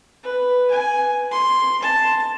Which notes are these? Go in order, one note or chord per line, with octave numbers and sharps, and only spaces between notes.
B4
G#5
C6
A5